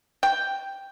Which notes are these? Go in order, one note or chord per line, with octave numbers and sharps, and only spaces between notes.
G5